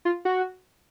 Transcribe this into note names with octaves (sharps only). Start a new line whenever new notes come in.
F4
F#4